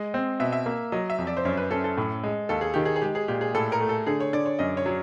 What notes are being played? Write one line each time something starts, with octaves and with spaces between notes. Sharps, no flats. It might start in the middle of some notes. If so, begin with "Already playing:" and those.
Already playing: G#3 D#5
C4
B2 E5
E5
A#3
F#3 D#5
E5
F2
D5
C5
F#2 C#5
B4
C#4 A4
A4
A2
G#3
D#2 A4
G#4
D#3 G4
G#4
G#4
G#3 G4
G#4
A#2 G4
G#4
A2 A4
A#4
A3
A4
D3 G#4
C#5
D3 D5
C#5
F#2 D#5
C#5
F#3